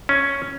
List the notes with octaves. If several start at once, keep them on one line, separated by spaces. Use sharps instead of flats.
C#4